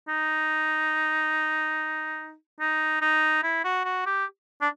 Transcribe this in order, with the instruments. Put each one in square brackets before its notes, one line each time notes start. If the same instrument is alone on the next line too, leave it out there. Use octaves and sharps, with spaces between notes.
[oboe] D#4
D#4
D#4
E4
F#4
F#4
G4
D4